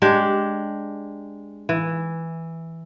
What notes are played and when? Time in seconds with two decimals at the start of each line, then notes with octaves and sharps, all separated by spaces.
0.02 G#3 D4 G4
1.69 E3